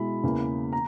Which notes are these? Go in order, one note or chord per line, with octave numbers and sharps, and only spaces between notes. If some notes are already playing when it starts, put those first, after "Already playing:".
Already playing: B2 G#3 E4 B5
E2 C#3 E3 A#3
A#5